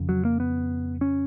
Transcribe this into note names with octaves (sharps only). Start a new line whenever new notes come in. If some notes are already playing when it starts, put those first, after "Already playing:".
Already playing: F2 C#3
F#3
A#3
B3
C#4